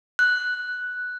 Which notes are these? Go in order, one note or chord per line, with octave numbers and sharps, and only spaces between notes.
F#6